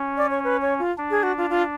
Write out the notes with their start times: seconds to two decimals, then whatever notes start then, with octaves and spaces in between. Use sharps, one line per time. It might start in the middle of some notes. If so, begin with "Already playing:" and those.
Already playing: C#4
0.17 D5
0.30 C#5
0.44 B4
0.62 C#5
0.79 F4
0.98 D4
1.11 G#4
1.23 F#4
1.38 F4
1.50 F4